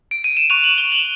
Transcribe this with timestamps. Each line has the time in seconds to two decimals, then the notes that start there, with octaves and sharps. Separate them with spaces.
0.11 D7
0.24 D#7
0.37 E7
0.50 C#6 F#6 D#7 F7
0.64 E7 F#7
0.78 F7 G7
0.92 E7 F#7